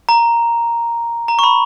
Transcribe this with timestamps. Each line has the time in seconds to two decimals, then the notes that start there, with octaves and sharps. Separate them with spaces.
0.09 A#5
1.28 A#5
1.39 C#6
1.44 B5